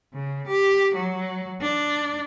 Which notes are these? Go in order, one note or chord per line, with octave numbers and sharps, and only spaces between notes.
C#3
G4
F#3
D4